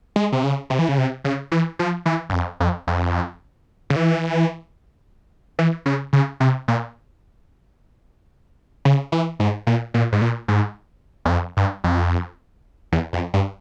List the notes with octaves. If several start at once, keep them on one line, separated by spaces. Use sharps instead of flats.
G#3
C3
C#3
C3
E3
C#3
C3
C#3
E3
F3
E3
G2
F2
F2
F2
C#3
E3
E3
C#3
C#3
C3
A#2
C#3
E3
G#2
A#2
A#2
G#2
A#2
G#2
E2
F2
G2
F2
E2
F2
G2